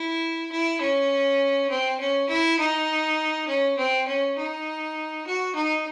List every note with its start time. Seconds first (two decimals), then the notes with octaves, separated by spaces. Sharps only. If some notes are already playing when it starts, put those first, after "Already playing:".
Already playing: E4
0.51 E4
0.81 C#4
1.70 C4
2.00 C#4
2.29 E4
2.59 D#4
3.48 C#4
3.77 C4
4.08 C#4
4.37 D#4
5.26 F#4
5.55 D#4